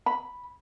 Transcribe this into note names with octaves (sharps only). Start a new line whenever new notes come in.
B5